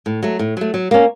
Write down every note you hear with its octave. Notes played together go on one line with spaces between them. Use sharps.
A2
F#3 A3
A2
F#3 A3
F#3
A#3 C#4